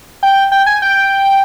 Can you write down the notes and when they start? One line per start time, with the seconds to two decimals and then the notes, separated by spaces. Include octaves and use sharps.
0.23 G5
0.52 G5
0.66 G#5
0.82 G5